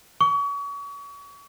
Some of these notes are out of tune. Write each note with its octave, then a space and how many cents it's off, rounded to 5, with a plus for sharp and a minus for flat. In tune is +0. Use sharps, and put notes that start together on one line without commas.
C#6 +35